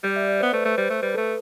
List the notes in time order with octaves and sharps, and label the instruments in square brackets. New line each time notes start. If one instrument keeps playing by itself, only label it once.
[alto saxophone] G3 [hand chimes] D5
[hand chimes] E5
D5
[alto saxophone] B3 [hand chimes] C5
[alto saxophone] A3 [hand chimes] B4
[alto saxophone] A3
[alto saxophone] G3 [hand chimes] C5
[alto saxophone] A3
[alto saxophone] G3 [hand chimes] B4
[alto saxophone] A3 [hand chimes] A4